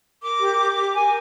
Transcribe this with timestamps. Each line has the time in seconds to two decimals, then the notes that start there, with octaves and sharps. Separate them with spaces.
0.22 A#4 D6
0.40 G4
0.58 G4
0.76 G4
0.94 A#4 G#5